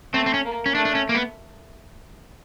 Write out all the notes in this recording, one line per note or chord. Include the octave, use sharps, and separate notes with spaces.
A3 C4
C4
C#4
A#3
C#4
A3 D4
D4
C#4
A#3
B3